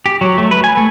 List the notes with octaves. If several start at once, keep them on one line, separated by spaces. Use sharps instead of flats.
G4
F#3
A3
B4
G#5
A3